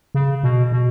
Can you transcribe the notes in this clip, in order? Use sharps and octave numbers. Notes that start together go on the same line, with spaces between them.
C#3
B2
B2